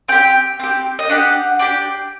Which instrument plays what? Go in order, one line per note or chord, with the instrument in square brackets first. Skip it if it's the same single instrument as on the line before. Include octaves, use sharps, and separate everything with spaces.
[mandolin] C4 G4 G5
C4 G4
D#5
D4 G4 F#5
D4 G4 G5